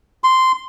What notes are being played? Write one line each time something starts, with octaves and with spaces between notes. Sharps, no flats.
C6